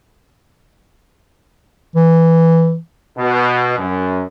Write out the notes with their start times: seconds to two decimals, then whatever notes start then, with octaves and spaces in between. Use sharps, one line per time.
1.96 E3
3.18 B2
3.78 F#2